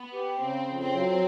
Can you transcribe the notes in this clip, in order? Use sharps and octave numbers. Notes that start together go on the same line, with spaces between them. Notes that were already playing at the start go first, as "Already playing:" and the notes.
Already playing: B3
G4
C#3 C4
F2
C4
F#3